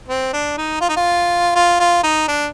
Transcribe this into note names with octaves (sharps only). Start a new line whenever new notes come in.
C4
D4
D#4
F4
D#4
F4
F4
F4
D#4
D4